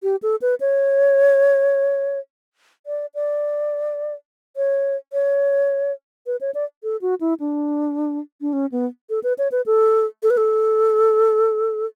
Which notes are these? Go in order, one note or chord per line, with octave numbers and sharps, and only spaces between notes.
G4
A4
B4
C#5
D5
D5
C#5
C#5
B4
C#5
D5
A4
F#4
E4
D4
D4
C#4
B3
A4
B4
C#5
B4
A4
A4
B4
A4